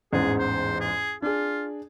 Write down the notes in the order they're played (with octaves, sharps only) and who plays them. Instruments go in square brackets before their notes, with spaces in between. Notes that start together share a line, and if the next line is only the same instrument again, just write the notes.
[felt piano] A1 E2 G#2 [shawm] G#4
[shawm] C5
G#4
[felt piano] D4 G#4 [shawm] F4